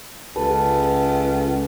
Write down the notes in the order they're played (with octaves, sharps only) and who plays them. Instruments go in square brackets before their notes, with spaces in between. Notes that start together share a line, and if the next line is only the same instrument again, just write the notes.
[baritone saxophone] C#2 [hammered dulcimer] A4 B4